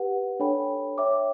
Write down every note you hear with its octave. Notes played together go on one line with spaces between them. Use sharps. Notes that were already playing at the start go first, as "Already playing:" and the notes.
Already playing: G4 B4 F#5
D4 A4 C#5 G5 B5
C#5 E5 G5 D6